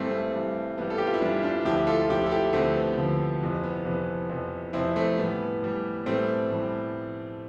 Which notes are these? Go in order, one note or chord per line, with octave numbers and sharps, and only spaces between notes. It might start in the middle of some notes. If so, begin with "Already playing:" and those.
Already playing: G2 E3 G3 A3 C4
A3
G2 E3 G3
G2 E3 G3 B3
A4
G4
F4
E4
G2 E3 G3 B3 D4
D4 F4
D2 D3 F3 E4 G4
F4 A4
F4
D2 D3 F3 E4 G4
A4
E4 G4
D2 D3 F3 A3 C4
B3
D2 D3 F3
F2 C3 E3
B3
F2 C3 E3
F2 C3 E3
F2 C3 E3 C4 E4
A3 C4
A2 E3 G3 B3
A2 E3 G3
A2 E3 G3 A3 C4
A2 E3 G3